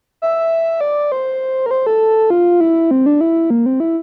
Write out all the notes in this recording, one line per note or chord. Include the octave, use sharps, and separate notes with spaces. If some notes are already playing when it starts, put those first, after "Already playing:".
E5
D5
C5
A#4
C5
A4
F4
E4
C4
D4
E4
A#3
C4
E4